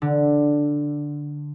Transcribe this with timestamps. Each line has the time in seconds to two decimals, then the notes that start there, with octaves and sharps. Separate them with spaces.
0.02 D3